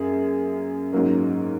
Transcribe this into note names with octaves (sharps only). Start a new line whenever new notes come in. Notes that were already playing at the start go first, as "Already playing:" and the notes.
Already playing: F#2 A#3 G#4
G#2 F#3 A#3 C#4